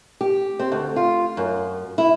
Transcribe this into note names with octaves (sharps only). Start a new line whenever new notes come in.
G4
C4
D2
F4
F#2
E4